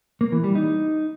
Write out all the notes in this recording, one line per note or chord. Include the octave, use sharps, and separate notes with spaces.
A#3
E3
G3
D#4